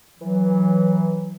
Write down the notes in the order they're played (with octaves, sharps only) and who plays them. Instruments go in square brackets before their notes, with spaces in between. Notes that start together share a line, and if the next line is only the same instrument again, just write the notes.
[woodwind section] E3 F#3